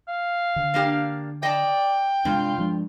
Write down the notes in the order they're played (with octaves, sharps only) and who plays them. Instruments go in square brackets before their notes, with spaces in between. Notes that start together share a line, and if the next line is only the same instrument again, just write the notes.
[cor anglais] F5
[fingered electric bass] D3
[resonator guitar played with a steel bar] A#3 D4 G4
[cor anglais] D5 [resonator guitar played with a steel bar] D#5 A5 [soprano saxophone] G5
[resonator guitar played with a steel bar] G2 [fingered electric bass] C3 G#3 D4 [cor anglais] F4
[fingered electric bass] F3 G#3 D4